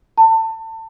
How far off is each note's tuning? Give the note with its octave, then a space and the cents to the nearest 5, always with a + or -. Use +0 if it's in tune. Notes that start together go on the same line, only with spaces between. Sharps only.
A5 +30